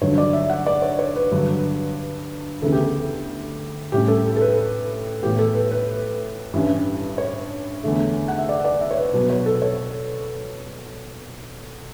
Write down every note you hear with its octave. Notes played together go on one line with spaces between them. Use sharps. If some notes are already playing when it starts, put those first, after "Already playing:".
G2 D3 F#3 C#5
D5
E5
F#5
D5
C#5
C#5
B4
G2 D3 F#3
D2 C#3 E3 B3 A4
G4
A4
A2 G3 C#4 G4
A4
A4
B4
A2 E3 B3 G4
A4
B4
B4
G2 E3 G3 C#4
C#5
E2 D3 A3
F#5
E5
D5
D5
E5
C#5
B4
B2 F#3 B3 B4
C#5
A4
C#5